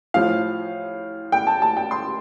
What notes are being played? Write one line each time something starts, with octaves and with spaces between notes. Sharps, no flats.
A2 F3 F5
G5
A5
A5
G5
C6